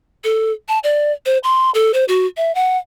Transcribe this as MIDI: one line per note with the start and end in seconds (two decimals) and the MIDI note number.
0.24 0.52 69
0.68 0.79 81
0.83 1.12 74
1.26 1.38 72
1.43 1.70 84
1.74 1.91 69
1.94 2.04 72
2.08 2.26 66
2.37 2.54 76
2.55 2.77 78